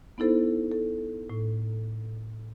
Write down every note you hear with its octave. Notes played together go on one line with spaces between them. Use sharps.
B3 D#4 E4 A4 C5
A4
A2